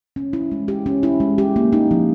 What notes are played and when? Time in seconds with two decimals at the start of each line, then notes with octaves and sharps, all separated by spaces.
0.16 C#4
0.33 E4
0.52 G#3
0.68 G4
0.86 C#4
1.03 E4
1.20 G#3
1.38 G4
1.56 A#3
1.73 D#4
1.91 F3